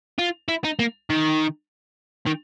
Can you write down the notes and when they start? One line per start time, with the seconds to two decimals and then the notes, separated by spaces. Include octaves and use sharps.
0.19 F4
0.49 E4
0.64 D#4
0.79 A#3
1.10 D#3
2.26 D#3